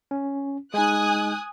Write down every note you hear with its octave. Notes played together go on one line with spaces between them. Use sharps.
C#4
G#3 D#4 G#5 D#6 F#6